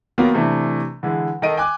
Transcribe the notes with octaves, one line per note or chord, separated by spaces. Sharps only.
D#3 F#3 A#3 B3 F4
C3 E3 A3 D4
D3 E3 G#3
D#3 A4 D#5 D7 D#7
G5 G#5 D6 F#6